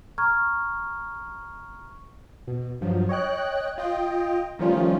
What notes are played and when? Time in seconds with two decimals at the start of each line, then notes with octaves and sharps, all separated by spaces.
0.18 A#5 C#6 F6 G#6
2.47 B2
2.81 G2 F3 F#3
3.09 C#5 D#5 G5 F#6
3.78 F4 D#5 G5
4.59 D#3 F3 G3 A3 C#4 F4